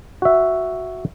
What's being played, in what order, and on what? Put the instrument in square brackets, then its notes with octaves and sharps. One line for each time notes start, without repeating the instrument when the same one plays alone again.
[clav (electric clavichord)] F#4 E5